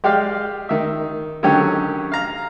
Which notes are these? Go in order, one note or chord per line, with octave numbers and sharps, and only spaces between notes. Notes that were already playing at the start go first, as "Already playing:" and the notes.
G#3 G4 D5 F5
D#3 E5
D3 D#3 F#3 C#4 G4
F5 A#5